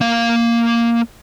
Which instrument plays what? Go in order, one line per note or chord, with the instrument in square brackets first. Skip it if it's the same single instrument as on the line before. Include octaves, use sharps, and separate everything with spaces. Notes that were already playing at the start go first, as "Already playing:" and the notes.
[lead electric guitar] A#3 F5